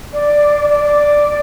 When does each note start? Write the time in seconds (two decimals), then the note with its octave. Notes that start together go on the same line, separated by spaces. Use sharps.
0.13 D5
0.69 D5
0.84 D5